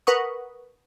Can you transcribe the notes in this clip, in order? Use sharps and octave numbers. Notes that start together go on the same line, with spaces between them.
A#4 B4 F#5 C#6 D#6